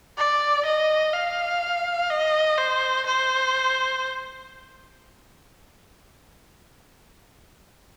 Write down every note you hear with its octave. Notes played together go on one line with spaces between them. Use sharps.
D5
D#5
F5
D#5
C5
C5